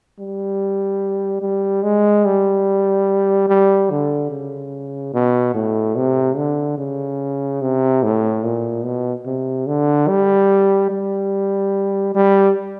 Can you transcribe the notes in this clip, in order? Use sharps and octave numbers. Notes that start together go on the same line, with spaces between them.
G3
G3
G#3
G3
G3
D3
C#3
B2
A2
C3
D3
C#3
C3
A2
A#2
B2
C3
D3
G3
G3
G3